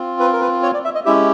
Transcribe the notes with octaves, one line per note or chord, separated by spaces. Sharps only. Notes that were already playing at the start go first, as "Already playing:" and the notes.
Already playing: C4 F4
B4
A#4
B4
C#5
D5
E5
D#5
G#3 C#4 E4 G4 E5